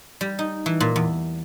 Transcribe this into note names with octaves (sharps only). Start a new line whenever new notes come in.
G3
D#4
E3
A#2
E2